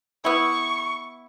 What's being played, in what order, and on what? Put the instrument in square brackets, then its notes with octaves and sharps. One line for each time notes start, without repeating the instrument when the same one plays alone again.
[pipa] B3 E4 [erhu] C#6